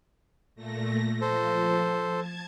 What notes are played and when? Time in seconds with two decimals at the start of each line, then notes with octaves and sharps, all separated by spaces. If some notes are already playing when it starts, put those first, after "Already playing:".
0.55 A#2 A3 A#6
1.21 F3 A4 C5
2.12 A5 G#6